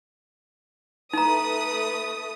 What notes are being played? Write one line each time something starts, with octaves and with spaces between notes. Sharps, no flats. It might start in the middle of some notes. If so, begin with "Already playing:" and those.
A3 D#4 B4 A#5 D#6